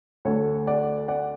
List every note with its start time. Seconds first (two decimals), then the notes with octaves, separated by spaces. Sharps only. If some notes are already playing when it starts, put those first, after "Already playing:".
0.25 D2 D3 A3 A4 C#5
0.67 D5 F#5
1.08 D5 F#5